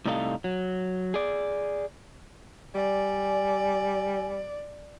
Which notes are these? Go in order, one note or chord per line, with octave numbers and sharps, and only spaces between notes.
A2 C3 G3 D#4 A4 F5
F#3
G#4 D5
G3 D5 G#5